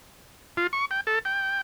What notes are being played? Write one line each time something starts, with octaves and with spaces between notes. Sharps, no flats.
F4
C#6
G5
A4
G5